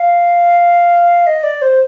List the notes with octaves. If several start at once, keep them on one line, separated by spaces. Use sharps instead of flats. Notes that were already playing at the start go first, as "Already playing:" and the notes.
Already playing: F5
D#5
D5
C5